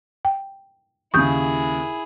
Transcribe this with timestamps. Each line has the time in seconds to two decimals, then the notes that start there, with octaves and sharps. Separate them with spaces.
0.25 G5
1.14 D#2 C#3 E4 G#4 C#6 D#6 G6